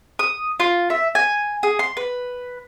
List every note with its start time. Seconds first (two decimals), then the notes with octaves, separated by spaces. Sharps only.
0.19 D#6
0.60 F4
0.90 E5
1.15 G#5
1.63 G#4
1.79 C6
1.97 B4